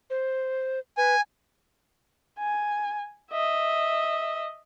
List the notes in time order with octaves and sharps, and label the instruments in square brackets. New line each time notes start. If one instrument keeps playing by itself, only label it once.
[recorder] C5
[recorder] B4 [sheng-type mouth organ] G#5
[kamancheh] G#5
D#5 E5